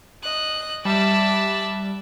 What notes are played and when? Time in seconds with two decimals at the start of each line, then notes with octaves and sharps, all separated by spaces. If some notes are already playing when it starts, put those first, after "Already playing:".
0.23 D#5 F#6
0.85 G3 E5 A5 D6 F#6